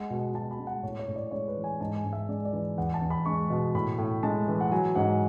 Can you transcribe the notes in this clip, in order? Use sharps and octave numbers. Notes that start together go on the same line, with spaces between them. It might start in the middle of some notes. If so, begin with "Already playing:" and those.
Already playing: G#3 F#5
B2
B2 A5
B5
G#3
F#5
A2 C#5
C#5
A2
D5
G#3 C#5
B4
E3
G#5
G#2 A5
G#5
G#2
E5
G#3 D5
D5
E3
E2 F#5
A5
E2
B5
G#3 C#6
B2
A2 B5
A2
G#3 A5
E3
F#5
F#3 G#5
G#2 F#5